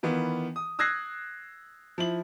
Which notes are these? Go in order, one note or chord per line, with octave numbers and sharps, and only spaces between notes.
D#3 E3 B3 F4
D#6
D#6 E6 F#6 G#6 A#6 C7
F3 E4 F#7